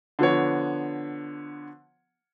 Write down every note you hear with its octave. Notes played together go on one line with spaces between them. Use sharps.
D3 F3 B3 C#5